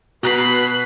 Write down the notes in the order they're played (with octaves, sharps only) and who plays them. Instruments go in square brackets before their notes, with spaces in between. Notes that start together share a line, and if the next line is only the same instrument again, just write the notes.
[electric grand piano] B2 [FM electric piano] F#4 F#6 C7 [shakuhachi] B4 [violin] B5